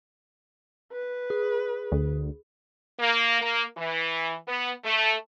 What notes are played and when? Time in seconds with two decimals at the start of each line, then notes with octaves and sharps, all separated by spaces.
0.92 B4
1.30 G#4
1.92 D2
3.00 A#3
3.42 A#3
3.77 E3
4.48 B3
4.85 A3